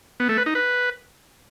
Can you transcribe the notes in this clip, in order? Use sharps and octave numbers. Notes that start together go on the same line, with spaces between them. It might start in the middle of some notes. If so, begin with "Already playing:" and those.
B3
A3
B4
D#4
B4